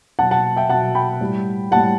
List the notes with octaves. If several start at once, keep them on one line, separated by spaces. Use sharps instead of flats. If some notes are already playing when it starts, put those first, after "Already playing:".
B2 F#3 F#5 A5
F#5 A5
E5 G5
B2 F#3 F#5 A5
G5 B5
A2 G3
A2 G3 F#5 A5